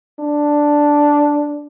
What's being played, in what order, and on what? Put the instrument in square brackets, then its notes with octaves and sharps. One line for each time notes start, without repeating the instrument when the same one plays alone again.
[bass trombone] D4